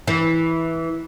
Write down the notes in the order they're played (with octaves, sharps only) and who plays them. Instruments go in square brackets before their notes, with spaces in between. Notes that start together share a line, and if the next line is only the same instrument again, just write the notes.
[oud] E3